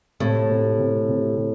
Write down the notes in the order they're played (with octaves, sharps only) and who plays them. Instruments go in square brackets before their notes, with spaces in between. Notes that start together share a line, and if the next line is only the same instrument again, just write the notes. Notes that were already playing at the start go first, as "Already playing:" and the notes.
[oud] A2 [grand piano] C3
[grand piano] C3
C3
C3
C3